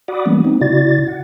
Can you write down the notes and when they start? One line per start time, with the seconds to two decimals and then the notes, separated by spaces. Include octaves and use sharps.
0.08 F#4 D5 F#5 B5 D6 D#6
0.26 E3 G3 G#3 A#3 B3 C#4
0.45 B3 C4 D#4
0.61 C#3 E4 F#4 D5 A6
1.07 F#5